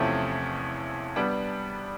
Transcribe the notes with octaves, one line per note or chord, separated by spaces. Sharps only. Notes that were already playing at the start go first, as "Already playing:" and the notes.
Already playing: E2 C3 F3 A3 C#4
G3 B3 D4